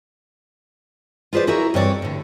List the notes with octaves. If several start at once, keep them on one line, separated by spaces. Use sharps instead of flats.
F4 G#4 B4 C5 D5
E4 F#4 G#4 A#4 C5 E5
G2 E3 C4 C#5 D5
A2 D3